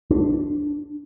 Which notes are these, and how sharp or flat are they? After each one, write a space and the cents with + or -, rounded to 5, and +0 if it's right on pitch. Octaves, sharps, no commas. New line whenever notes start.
D4 +5